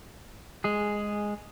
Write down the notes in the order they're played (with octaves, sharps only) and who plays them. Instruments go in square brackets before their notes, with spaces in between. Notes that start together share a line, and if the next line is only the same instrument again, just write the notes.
[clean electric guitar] G#3 G#4